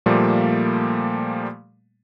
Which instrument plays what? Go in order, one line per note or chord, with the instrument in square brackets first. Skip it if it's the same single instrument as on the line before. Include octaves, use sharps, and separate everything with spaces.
[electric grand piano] A#2 F3 G3 A3 A#3